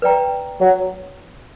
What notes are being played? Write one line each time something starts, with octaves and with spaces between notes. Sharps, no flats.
B4 D5 G5 A#5
F#3